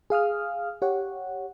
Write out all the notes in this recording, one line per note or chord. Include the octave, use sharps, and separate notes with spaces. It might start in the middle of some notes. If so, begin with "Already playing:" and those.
G#4 F5 D#6 F6
G4 C#5 F#5